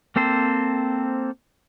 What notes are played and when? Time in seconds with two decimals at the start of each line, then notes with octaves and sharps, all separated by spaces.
0.16 A#3 C4 A4 C5